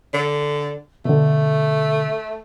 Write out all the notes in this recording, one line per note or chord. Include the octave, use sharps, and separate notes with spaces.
D3
B2 D3 A3